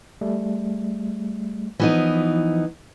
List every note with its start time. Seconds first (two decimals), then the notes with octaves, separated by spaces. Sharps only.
0.21 G3 A3
1.80 E3 F3 B3 D#4